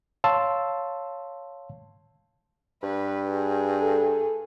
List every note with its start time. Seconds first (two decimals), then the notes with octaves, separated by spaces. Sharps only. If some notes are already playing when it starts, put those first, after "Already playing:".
0.24 C#5 F5 A5 C6 E6
2.83 G2 B4
3.31 G#4
3.81 A4